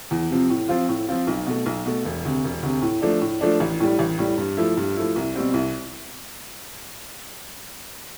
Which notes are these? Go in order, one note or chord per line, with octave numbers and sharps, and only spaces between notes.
E2
C3 F3 C4
A2
F3 C4 F4
A2
F3 C4 F4
B1
B2 A3
B1
B2 A3
E1
D2 C3
E1
D2 C3
A2
F3 A3 D4
A2
F3 A3 D4
A1
A2 G3
A1
A2 G3
G2
F3 A3 E4
G2
F3 A3 E4
C2
B2 G3 C4
C2